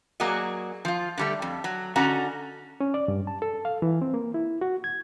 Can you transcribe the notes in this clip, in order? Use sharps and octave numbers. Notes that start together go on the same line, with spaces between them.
F#3 A#3 F#4 G#4 D5 D#5
F3 F4
D3 G3 A3
F2
F#3
D3 C#4 F#4 A4 D#5 A#5
C#4
D5
G2
A5
A4
F5
E3
C4
A#3
E4
F#4
G#6